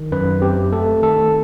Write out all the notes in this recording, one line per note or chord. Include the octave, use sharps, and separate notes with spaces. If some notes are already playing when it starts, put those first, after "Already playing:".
Already playing: D#3
F#2 B4
C4 G4
A3 A4
D#3 A4